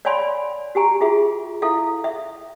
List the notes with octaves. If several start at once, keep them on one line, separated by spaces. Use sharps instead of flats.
C#5 D5 F5 G#5 B5 C6
F#4 G4 G#5 A#5
F4 F#4 G#4 E5
E4 A4 E5 F5
E5